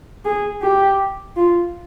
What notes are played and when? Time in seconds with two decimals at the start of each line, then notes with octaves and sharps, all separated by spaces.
0.25 G#4
0.62 G4
1.36 F4